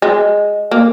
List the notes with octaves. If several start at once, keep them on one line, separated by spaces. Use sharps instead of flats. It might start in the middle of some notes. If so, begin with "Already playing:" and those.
G#3
A#3